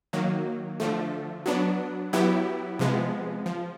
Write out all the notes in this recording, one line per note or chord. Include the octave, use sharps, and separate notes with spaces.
D#3 F#3 A#3
D3 F3 A3
F#3 B3 D4
F#3 B3 E4 G4
C3 F3 G#3 B3
F3